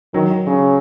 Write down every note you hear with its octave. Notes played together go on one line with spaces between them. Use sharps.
D#3 F#3
C#3